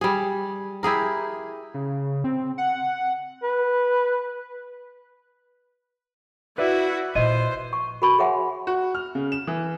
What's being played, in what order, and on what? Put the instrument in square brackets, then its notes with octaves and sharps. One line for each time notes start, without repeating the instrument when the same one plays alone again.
[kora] G3 G#4
E4 G4 G#4 A#4
[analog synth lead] C#3
C4
F#5
[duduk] B4
[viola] E4 F#4 [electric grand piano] B4 D5 E5
[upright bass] A#2 C4 [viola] C5 [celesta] D#5 D#7
[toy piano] C#6
F#4 A#4 B5 C#6
G#4 C#5 E5 F#5 G#5 C6
[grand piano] F#4
F6
C#3
E7
E3